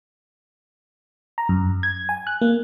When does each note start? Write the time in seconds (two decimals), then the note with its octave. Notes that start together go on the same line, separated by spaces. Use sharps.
1.38 A#5
1.49 F#2
1.83 G#6
2.09 G#5
2.27 F#6
2.41 A#3